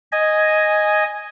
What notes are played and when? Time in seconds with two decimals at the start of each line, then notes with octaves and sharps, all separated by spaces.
0.12 D#5 G#5